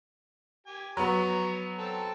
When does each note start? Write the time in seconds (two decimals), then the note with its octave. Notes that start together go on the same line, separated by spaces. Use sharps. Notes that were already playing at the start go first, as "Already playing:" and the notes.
0.66 G4 G#5
0.97 F#3 B3 C#5 A#5
1.78 C4 A4